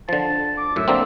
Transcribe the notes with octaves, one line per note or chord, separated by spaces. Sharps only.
D3 F3 A5
D6
F#2 A2 E5
D3 A#3 C4